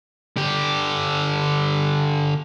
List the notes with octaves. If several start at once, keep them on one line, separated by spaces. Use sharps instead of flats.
D3 G4